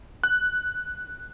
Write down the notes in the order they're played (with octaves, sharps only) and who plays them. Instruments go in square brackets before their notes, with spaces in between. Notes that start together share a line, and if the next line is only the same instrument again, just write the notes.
[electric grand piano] F#6